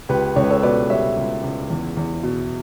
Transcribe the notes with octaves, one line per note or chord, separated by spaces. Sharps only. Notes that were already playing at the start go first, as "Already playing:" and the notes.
C#2 G4 B4
C#2 C#5
B4
A4 C#5
B2 B4 D5
G3 C#5 E5
C#2
C#2
E2
E2
B2